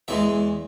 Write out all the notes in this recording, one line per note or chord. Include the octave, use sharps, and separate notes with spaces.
E2 E3 G#3 E5